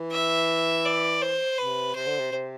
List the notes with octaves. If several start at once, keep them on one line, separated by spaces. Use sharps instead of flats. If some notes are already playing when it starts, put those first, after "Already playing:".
Already playing: E3
E5
D5
C5
C3 B4
C3 C5
D3
C3
C3